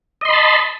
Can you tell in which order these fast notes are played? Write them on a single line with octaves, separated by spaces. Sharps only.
D#5 C6 B5 A5